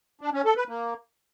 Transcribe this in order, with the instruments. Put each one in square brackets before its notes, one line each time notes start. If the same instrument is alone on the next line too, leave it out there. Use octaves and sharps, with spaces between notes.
[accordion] D4
C#4
A4
B4
A#3